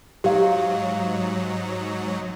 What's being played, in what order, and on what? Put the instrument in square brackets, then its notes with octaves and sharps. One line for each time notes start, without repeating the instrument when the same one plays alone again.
[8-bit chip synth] G#2 F#3 [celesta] G4 F5